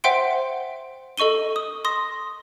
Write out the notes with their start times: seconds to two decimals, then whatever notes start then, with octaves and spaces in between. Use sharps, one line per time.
0.04 C5 E5 F#5 G5 C6 D7
1.18 A4 D#5 C#6 D#7 G7
1.56 D#6
1.85 C6 D#6 A#6